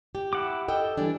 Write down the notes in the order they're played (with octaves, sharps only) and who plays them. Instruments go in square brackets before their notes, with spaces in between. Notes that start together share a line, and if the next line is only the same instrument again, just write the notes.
[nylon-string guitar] G4
[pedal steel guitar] E4 F#5 D6
[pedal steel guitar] A4 [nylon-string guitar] D#5 G5
[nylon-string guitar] E3 G3 D4